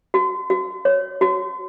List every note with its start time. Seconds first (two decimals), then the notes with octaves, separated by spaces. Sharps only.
0.14 F#4
0.50 F#4
0.85 C#5
1.21 F#4